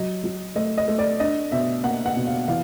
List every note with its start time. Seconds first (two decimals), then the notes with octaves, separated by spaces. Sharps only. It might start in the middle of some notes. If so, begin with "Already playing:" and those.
Already playing: F#3 D#5
0.24 F#3
0.55 A3 D#5
0.77 D#5
0.88 A3
0.98 D5
1.20 D4 D#5
1.52 B2 E5
1.84 A#3 F#5
2.06 F#5
2.16 B2
2.27 F5
2.48 E3 F5